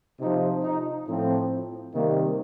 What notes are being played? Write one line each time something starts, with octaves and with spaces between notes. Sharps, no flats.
C3 F3 D#4
D#4
A2 F3 C4
C3 D#3 G3 A#3